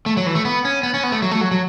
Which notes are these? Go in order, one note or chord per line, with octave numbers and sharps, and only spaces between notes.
A3
F#3
E3
A3
B3
C#4
B3
C#4
B3
A3
F#3
A3
F#3
F#3